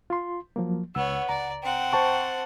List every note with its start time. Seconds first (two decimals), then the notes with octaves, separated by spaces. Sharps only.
0.10 F4 C6
0.56 F3 F#3 A#3
0.95 C#2 B3 C#5 F#5 E6
1.29 C#2 D5 A#5
1.63 C4 F#5 G5
1.93 C5 A5 C#6